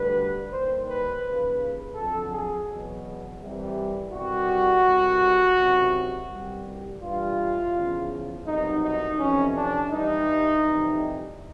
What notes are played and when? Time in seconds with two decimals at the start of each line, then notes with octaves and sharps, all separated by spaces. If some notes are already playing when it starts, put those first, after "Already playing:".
Already playing: D2 D3 G3 B4
0.51 D#2 D#3 G3 C5
0.87 B4
1.23 D#2 C#3 F3 B4
1.95 F2 D3 F#3 A4
2.32 G#4
2.67 E2 B2 F#3
3.40 C2 C3 E3 G3
4.12 C2 B2 G3 F#4
4.85 C2 B2 G3
5.57 C#2 C3 D#3 F#3
6.29 C2 B2 G3
7.01 G2 E3 G3 F4
7.74 E2 C#3 F3
8.46 C2 B2 F#3 D#4
8.83 D#4
9.18 F2 C3 E3 C#4
9.54 D4
9.91 G2 E3 G3 D#4
10.63 F2 C3 E3 G3